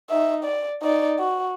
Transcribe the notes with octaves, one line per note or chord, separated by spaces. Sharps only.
D#4 E5
D5
D#4 D5
F#4